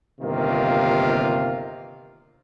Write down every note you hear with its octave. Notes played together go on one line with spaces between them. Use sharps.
G1 C3 D#3 A#3 F4